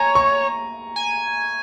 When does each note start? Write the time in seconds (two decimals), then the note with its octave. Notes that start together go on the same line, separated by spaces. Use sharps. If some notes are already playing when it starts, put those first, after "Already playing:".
Already playing: C#5 G#5 A#5
0.15 C#6
0.96 G#5